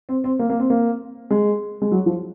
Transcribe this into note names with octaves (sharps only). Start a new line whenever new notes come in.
C4
C4
A#3
A#3
C4
A#3
G#3
G#3
F#3
F3